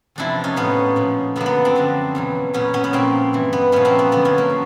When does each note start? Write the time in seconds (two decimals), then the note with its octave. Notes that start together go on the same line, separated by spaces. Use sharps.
0.16 E2 C3 F3 D4 E4
0.44 C#4 D#4
0.56 A2 F3 B3 C#4
0.96 A#2 F3
1.36 F#2 D3 F#3 A#3 B3
1.46 B3
1.65 C4 D4
1.75 F#2 D3 F3
2.15 E2 B2 F#3
2.53 A#2 F#3 B3 C#4
2.74 B3 C#4
2.84 B3
2.93 A#2 F3 A#3 C4
3.33 G2 E3
3.53 B3
3.72 A#2 F3 B3 C#4
3.85 A#3 C4
3.99 B3
4.12 F#2 D3 F3 B3
4.25 B3 C#4
4.38 A#3
4.50 F3